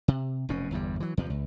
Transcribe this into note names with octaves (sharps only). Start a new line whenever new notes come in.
C3
F1 F#2 B2 C#4
G1 E2 G2 G3
E3 F#3
E2 C3 F3
C#2